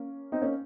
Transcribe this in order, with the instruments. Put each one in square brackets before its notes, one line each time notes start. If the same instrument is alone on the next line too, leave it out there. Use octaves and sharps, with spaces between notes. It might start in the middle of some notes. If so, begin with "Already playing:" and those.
Already playing: [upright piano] A#3 C#4
C4 D#4
A#3 C#4